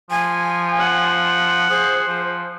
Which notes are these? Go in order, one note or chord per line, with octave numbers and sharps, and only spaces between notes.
F3 G#5
F#5
G#4 C5
F3